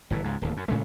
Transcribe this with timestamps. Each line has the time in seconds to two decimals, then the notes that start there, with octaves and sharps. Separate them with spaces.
0.10 G1 A2 E3
0.24 C#2 G#2
0.42 D1 D#2
0.57 F#2
0.68 A2 C#3 G#3 A3